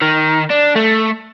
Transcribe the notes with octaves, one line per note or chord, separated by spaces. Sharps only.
D#3
D4
A3